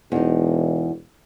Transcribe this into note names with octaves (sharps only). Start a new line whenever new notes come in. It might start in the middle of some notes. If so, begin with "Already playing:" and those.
E1 E2 D#4